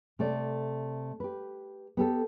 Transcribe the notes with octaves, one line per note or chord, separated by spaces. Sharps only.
C3 A3 D5
G4 B4
B3 G4 A4